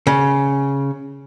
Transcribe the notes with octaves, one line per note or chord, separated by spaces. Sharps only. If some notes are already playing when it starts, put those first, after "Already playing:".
C#3